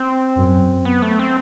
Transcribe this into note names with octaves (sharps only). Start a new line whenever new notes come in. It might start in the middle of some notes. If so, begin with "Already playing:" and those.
Already playing: C4
F#2
B3
A3
C4